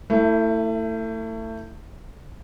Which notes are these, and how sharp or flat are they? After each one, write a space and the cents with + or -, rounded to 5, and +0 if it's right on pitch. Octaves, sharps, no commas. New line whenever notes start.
A3 +30 E4 +0